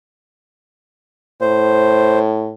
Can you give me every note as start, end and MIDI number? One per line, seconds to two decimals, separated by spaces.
1.41 2.53 45
1.41 2.19 72